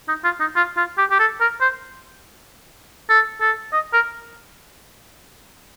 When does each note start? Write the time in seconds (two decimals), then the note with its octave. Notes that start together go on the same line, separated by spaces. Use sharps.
0.08 D#4
0.24 F4
0.40 D#4
0.56 F4
0.77 F4
0.98 G4
1.11 G4
1.20 A4
1.41 A#4
1.61 C5
3.10 A4
3.41 A4
3.73 D#5
3.94 A#4